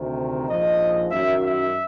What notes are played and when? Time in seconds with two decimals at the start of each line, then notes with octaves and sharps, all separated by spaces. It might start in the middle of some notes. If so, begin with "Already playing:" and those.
Already playing: D2 C3 D#3
0.48 A#1 G#2 F3 D#5
1.11 F#2 D#3 F#3 E5
1.42 E5